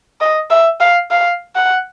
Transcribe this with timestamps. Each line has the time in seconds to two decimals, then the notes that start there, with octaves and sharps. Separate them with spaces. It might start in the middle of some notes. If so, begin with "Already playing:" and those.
0.21 D#5
0.50 E5
0.80 F5
1.11 F5
1.56 F#5